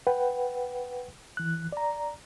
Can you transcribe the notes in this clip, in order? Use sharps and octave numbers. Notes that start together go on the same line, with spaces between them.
B4 F#5 G5
E3 F#6
D5 A#5